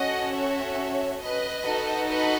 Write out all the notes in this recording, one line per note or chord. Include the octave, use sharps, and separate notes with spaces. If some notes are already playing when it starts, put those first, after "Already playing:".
Already playing: C#4 F#4 A4 D#5 F#5
C#5 E5
B4 D#5
D#4 F#4 A4
B4 D#5